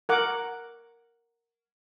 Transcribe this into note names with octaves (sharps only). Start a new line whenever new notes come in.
A#4 F#5 D6